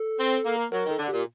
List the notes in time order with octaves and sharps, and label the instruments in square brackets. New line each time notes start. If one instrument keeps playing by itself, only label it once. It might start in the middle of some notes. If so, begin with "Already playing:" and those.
Already playing: [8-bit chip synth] A4
[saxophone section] C4
A#3
[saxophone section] F#3 [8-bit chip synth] A#4
[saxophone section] D#3
[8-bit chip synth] A4
[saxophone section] D3
[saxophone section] A#2 [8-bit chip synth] G4